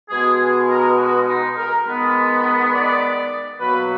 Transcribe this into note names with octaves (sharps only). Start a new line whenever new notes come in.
B2 G#3 B3 G#4
G#4
A#4
F#4
D#4
A#4
D#3 G#3 B3 B4
B4
D5
B2 F#3 A#3 B4